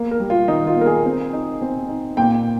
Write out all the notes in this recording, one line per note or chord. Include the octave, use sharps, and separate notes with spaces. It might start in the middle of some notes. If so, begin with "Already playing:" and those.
Already playing: A#3
A#4
G3
F4
D#3 D#4
F4
A#3
A#4
G#4
C4
D#4
C4
D#4
A#2 G5